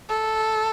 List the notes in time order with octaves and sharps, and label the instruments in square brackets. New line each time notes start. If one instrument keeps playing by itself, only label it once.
[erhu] A4